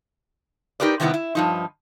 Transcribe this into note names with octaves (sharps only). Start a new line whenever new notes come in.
D#4 G4 A#4 B4 D5
C3 D#3 G3 B3 E4 F#5
E4
G2 F3 D#4